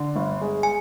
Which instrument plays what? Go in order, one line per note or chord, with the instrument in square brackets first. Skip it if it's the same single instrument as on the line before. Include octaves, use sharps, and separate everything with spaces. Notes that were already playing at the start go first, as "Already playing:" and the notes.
Already playing: [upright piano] D3
G1
G#3
[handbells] G#5